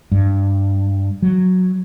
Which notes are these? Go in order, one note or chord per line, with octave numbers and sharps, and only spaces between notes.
G2
F#3